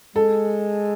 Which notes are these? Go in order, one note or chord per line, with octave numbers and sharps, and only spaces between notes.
G#3 A4